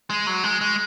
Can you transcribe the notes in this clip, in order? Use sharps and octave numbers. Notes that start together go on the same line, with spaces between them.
G#3
F#3
G#3
G#3